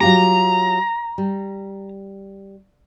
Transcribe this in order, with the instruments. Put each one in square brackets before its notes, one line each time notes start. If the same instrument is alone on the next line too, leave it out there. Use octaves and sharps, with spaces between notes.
[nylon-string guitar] F#3 F4 G4 [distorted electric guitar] A#5
[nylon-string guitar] G3